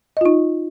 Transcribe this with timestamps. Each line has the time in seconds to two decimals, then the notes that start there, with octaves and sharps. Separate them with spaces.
0.17 D#5
0.21 F4
0.25 D#4